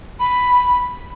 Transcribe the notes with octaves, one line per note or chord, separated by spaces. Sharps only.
B5